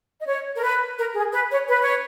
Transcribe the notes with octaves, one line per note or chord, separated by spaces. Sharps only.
D#5
C#5
A#4
B4
A#4
G#4
B4
C#5
B4
C#5